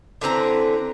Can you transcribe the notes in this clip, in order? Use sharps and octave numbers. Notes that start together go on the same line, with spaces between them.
D3 E3 C4 A#5